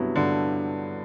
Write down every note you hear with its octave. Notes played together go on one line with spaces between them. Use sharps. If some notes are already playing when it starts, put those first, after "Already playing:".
Already playing: G2 C3 F#3 B3 E4
G2 D3